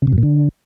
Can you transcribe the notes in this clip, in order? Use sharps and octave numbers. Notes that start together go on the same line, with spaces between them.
C#3
C3
F#2
A#2
D3